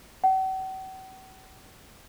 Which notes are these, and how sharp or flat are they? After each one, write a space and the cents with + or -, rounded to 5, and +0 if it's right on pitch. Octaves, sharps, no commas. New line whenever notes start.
F#5 +45